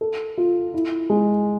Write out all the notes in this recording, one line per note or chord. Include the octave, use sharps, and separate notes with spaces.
A4
F4
E4
G#3